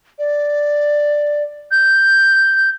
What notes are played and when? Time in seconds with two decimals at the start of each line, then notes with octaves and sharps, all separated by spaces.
0.19 D5
1.71 G6